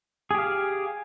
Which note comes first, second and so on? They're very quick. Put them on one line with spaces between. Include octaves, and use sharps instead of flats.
G#4 G4 F5